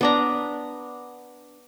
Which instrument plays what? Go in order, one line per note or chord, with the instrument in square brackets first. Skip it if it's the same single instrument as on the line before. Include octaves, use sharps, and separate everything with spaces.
[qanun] B3 D4 A#5